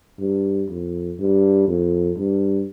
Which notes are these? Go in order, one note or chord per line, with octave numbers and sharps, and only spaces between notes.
G2
F2
G2
F2
G2